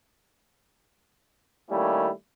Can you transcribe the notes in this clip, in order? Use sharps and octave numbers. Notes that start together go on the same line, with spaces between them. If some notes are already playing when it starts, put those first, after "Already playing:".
D#3 G3 A3 A#3 C#4 E4